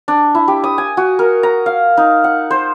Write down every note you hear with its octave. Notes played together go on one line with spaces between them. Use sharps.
D4
E4
G4
D#6
G#5
F#4
A#4
A#5
F5
D#4
F#5
C5